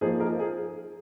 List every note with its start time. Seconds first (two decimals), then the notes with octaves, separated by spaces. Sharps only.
0.01 F3 A#3 D#4 G#4
0.20 A#4
0.39 G#4